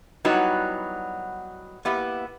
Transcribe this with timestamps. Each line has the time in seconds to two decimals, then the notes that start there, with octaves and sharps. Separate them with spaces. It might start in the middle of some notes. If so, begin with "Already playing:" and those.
0.25 F#3 G3 B3 D#4 E4 F#4
1.85 A#3 B3 E4 G4